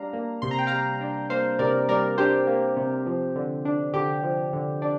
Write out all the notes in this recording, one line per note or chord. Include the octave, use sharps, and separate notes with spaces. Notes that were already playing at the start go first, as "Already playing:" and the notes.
Already playing: G3 D4 F5 A#5
A#3
C3 C6
A#5
G5
G3 F5 A#5
D4
A#3 C5 F5
C3 A#4 D5
G3 A#4 D5
D4 G4 C5
A#3
C3
F3
D3
D4
D3 G4
F3
D3
D4